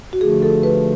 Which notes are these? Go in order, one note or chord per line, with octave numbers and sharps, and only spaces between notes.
F#4
D3 F3 A3 G#4
A4
B4